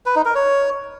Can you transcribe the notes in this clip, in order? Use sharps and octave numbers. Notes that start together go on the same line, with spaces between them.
B4
D#4
A#4
C#5